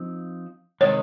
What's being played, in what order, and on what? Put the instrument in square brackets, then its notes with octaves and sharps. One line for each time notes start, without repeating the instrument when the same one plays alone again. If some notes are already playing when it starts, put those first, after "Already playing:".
Already playing: [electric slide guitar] F3 C4 D#4
[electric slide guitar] C3 D#3 G#3 [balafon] C#5